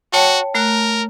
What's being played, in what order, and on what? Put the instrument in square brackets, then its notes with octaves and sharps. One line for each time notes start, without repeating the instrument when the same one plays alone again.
[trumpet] F#4 [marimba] C#5 G5 A5
[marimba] A3 A#5 F#6 [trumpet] A#4